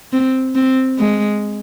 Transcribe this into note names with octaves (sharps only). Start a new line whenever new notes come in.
C4
C4
G#3